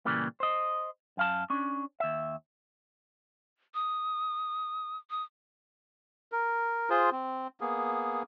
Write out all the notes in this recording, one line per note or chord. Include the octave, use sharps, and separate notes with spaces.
A#2 C#3 E3 G3 A#3
C5 D#5
F#2 F5 A5
C#4 D4
D#2 E5
D#6
D#6
A#4
F4 G#4 C5
C4
A#3 B3 G#4